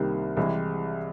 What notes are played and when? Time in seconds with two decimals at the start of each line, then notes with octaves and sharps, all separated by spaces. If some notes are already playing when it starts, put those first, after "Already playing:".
Already playing: C2 C3 D#3 G3 A#3
0.37 C2 C3 E3 G#3